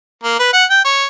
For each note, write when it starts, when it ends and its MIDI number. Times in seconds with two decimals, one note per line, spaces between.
0.24 0.38 58
0.40 0.52 71
0.53 0.65 78
0.70 0.84 79
0.85 1.06 73